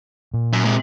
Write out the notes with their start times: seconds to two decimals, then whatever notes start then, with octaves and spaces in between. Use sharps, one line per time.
0.34 A#2
0.53 F#2
0.65 G#2 C3